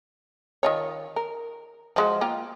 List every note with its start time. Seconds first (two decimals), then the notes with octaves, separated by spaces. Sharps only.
0.63 D#3 F4 C#5
1.16 A#4
1.96 F3 G#3 F#4
2.21 A#3 F4 G5